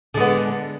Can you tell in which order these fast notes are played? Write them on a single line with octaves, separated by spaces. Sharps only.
D3 G#3 B3